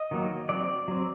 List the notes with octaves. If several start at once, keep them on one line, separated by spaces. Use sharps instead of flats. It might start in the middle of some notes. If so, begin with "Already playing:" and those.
Already playing: D#5
D#3 F#3 A#3
F#3 C4 D5
F#3 C4